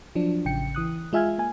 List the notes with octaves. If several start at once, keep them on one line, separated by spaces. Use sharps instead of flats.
F3 F#3 D4
A1 C#3 G5 C#7
E3 D#6 F#6
G#3 F4 E5 G#5 F6 G#6
A#3 G#5